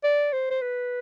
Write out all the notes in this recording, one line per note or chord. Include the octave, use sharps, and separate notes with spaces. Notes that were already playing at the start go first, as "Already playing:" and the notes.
D5
C5
C5
B4